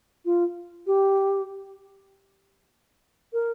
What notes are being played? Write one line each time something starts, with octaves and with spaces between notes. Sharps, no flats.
F4
G4
A#4